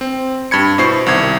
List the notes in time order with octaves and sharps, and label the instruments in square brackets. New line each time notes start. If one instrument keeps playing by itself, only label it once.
[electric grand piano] C4
G2 B5 G#6 C#7
B2 E4 C5 C#6 C7
C2 D#3 G#6